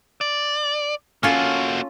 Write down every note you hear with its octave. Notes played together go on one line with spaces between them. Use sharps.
D5
A#3 C#4 F4 F#4 A4